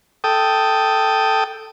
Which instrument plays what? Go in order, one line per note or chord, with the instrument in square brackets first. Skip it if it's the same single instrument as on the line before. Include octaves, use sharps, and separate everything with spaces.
[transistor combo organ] A4 G5 D#6